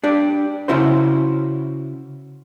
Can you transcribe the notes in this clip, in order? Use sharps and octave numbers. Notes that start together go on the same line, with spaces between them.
D4 G4 D5
C#3 C#4 E4 F#4 C5